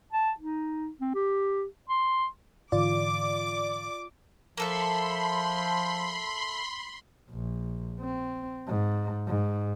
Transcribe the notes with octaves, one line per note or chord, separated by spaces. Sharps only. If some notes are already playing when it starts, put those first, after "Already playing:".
A5
D#4
C4
G4
C6
G#2 D3 E3 F4 D5 D6
F3 A#3 A4 E5 B5 C6
A#1
C4
G#2
G#2